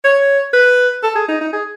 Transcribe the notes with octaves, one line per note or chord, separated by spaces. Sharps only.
C#5
B4
A4
G#4
D#4
D#4
G#4